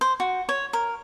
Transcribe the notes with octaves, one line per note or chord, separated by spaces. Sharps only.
C5
F#4
C#5
A#4